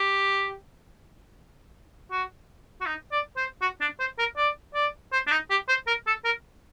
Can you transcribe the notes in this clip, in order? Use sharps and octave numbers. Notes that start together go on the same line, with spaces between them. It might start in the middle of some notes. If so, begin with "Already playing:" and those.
Already playing: G4
F#4
F#4
D#4
D5
C5
F#4
D4
C5
A#4
D5
D5
C5
D4
D#4
G4
C5
A#4
A4
A#4